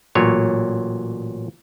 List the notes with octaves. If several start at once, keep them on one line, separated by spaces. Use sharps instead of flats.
A1 A#2 F#3 C#5